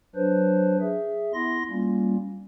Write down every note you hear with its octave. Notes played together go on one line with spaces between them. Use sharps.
F#3 D4 B4 C5
G#4 E5
B3 E4 C6 A#6
G3 A#3 C#4 F4